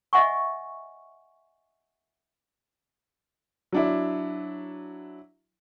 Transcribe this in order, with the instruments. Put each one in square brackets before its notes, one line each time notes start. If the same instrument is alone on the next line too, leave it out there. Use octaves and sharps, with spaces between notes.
[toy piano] D#5 E5 F#5 G#5 C#6
[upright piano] F#3 D4 E4